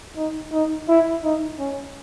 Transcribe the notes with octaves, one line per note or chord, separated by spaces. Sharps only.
D#4
D#4
E4
D#4
C#4